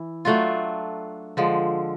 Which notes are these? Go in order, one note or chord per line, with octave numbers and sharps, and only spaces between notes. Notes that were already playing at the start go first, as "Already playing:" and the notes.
Already playing: E3 E4
F#3 A3 D4 F4
D3 F3 G#3